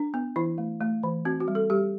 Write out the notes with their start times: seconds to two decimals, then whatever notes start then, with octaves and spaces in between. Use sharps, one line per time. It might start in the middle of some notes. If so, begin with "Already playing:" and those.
Already playing: D4
0.14 B3
0.36 E3 E4
0.58 A3
0.81 A3
1.03 E3
1.25 C4 F#4
1.40 F#4
1.48 G3
1.55 A4
1.70 G3 G4